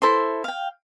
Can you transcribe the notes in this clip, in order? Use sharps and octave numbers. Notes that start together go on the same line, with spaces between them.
E4 A4 C5 C6
F5 G5